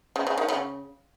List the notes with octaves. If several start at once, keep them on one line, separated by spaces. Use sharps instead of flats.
C#3
C#3
D#3
C#3